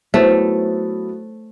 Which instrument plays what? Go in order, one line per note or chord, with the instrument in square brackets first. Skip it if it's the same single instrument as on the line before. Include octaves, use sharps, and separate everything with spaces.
[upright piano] F#3 B3 E4 [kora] A3 [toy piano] D#4 C5 C#5